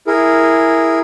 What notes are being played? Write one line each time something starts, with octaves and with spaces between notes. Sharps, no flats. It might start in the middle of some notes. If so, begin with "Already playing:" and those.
E4 G#4 A#4